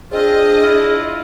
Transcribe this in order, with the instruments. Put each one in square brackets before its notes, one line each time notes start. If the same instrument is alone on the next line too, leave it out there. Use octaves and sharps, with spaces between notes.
[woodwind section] C4 F4 [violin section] D4 D#5 [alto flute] G#4
[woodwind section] E4 F4